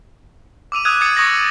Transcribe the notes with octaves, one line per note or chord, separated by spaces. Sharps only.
D6 E6 D#7 F7
D#6 E6 F#6 G#6
D#6 G#6 A6 C#7
C#6 D#6 G6 A6 A#6 F#7